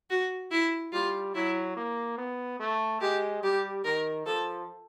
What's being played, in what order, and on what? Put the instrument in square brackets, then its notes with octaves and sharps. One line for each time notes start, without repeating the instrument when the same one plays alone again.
[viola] F#4
E4
[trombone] G3 [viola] F4
[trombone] F#3 [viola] E4
[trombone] A#3
B3
A3
[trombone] G#3 [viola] G4
[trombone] G3 [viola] G4
[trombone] D#3 [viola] A#4
[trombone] F3 [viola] A4